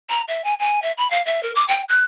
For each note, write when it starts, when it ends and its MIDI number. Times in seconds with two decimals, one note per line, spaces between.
0.09 0.22 82
0.28 0.42 76
0.44 0.54 80
0.59 0.80 80
0.82 0.92 76
0.98 1.09 83
1.10 1.24 77
1.25 1.40 76
1.43 1.51 70
1.55 1.64 86
1.68 1.82 79
1.89 2.04 90